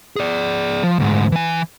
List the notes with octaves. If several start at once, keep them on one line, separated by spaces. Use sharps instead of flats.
G#4 D5
F3
D2 G#2
E3 G#5